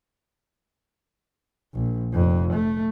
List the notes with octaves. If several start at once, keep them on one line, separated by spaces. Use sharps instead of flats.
A#1
F1 F2
A3